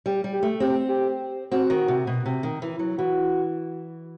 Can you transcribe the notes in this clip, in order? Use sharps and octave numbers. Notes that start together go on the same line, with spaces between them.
G3 G4
G3
G4
A3
C4 G4
G4
C4 F#4
D#3
C3
B2
C3
D#3
E3
F#3
E3 F#4